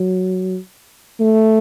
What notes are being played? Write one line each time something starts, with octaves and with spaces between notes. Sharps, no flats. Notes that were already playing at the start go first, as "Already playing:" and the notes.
Already playing: F#3
A3